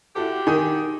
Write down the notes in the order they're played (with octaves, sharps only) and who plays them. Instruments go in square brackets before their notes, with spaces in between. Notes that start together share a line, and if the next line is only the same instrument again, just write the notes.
[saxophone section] D3 D4 G4 [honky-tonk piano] E4 F#4 A4
[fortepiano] D#3 [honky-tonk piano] G#5 D#6